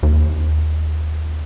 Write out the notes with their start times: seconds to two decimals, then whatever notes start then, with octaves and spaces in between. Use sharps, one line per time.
0.03 D#2